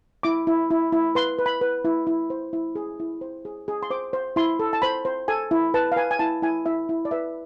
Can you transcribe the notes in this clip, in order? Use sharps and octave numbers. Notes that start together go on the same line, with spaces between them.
E4 D6
E4
E4
E4
B4 C6
B4
B5
B4
E4
E4
C5
E4
G#4
E4
C5
G#4
G#4
C6
C5 D6
C5
E4 C6
A4
A5
C5 B5
C5
A4 G#5
E4
B4 A5
F5
B4 G#5
G#5
E4 A5
E4 G#5
E4 E5
E4
D5
B4 E5